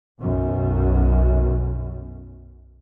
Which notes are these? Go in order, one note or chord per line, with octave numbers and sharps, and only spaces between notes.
B1 F#2